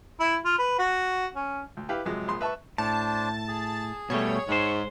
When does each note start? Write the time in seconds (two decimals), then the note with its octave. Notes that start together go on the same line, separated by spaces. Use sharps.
0.20 E4
0.45 F4
0.59 B4
0.79 F#4
1.35 C#4
1.77 D2
1.89 E4 G4 B4 F5 G5
2.06 F2 C3 F#3 G#3
2.28 A#1 G#4 C6
2.41 B4 E5 A5 B5 C#6
2.78 A2 D4 C5 A5
3.48 G#4
4.10 B2 G3 A3 C#5
4.49 G#2 G#3 C5